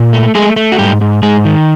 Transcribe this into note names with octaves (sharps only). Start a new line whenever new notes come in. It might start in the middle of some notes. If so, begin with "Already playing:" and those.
Already playing: A#2
A3
G#3 A3 G#4
A3
F#4
G#2 G3 G4
G#2
G#2 G#3 G#4
D#3